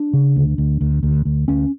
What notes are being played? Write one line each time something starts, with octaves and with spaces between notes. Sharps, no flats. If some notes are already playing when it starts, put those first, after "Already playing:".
Already playing: D4
C#3
D2
D2
D2
D2
D2
D2 C#4